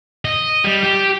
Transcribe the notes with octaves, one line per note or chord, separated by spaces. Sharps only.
D#5
G3
G4